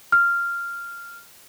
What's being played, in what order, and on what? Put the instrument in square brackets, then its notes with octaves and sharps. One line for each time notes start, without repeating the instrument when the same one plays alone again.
[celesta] F6